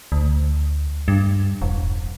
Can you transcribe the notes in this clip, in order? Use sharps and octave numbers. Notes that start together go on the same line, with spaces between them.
D2
G2
E1